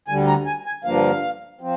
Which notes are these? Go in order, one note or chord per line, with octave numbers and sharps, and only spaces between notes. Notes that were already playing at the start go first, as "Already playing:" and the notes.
D2 D3 G3 G#5
A#5
G#5
G#5
G2 D3 F3 A#3 F5
F3 C4